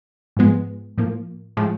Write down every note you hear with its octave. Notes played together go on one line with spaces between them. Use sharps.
G#2 F3 G#3 B3
A2 F3 A#3
A2 F3 G#3